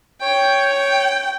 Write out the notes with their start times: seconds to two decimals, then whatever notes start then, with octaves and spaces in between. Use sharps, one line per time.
0.22 C#5 G5
0.74 G5